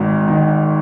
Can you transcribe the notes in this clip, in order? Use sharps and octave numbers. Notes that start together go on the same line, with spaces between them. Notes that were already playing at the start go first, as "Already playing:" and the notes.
Already playing: G#1 G#2 D#3
D#3